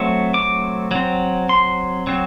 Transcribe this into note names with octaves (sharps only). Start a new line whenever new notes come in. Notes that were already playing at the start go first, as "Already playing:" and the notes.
Already playing: F#3 A3 C4
D6
F#3 C4
C6
F#3 C4